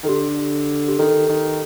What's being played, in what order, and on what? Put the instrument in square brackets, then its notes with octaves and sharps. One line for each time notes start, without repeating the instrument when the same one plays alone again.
[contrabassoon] D#3 [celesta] A4
[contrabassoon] D3 [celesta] G4
[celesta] G4
[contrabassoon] D#3 [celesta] A4
[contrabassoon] D#3